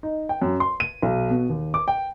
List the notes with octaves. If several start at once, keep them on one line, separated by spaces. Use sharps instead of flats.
D#4
G5
F#2
C6
D#7
B1
B2
D#2
D6
G5